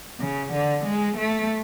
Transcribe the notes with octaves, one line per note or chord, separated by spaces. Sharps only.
C#3
D3
G#3
A3